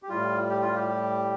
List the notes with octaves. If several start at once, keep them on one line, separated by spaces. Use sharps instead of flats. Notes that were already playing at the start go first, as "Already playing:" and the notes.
G4
A2 G3 F4
G4
F4
G4